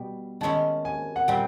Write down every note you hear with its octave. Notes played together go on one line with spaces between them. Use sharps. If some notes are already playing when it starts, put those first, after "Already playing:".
Already playing: B2 G3 B3 G4
D#3 G#3 C#4 E4 A5
G#5
F#5
A#2 G3 C4 G5